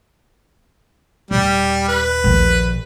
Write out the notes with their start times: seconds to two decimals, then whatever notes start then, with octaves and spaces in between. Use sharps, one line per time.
1.31 D#1 G3
1.88 B4
2.24 A#1 D#2